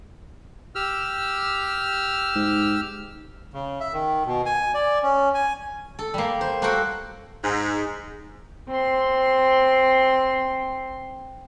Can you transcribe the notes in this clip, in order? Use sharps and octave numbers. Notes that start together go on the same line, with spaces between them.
G4 E6 F6
G#2
C#3
E5
D#3
B2
G#5
D5
C#4
G#5
A4
G3 A#3
C5
A#3 F#4 A4 C5 F#5 G5
G#2
C4 C6